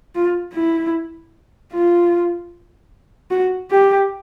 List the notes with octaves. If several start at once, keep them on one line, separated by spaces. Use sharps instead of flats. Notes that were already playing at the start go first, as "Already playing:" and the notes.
F4
E4
F4
F#4
G4